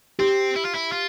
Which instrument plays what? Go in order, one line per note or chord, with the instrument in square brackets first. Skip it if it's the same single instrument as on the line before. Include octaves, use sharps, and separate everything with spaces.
[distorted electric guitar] C4 [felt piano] G4
[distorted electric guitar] E4
F4
E4
F4